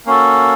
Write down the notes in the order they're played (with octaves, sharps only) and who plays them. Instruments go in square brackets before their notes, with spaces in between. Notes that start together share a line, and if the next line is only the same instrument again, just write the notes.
[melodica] A#3 C#4 F#4 A4